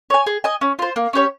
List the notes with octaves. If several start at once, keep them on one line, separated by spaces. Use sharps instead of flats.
C#5 G#5
G#4
D#5 G#5
C#4
F4 C5
A#3
C#4 G4 C#5